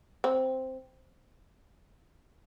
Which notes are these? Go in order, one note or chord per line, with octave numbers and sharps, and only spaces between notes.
C4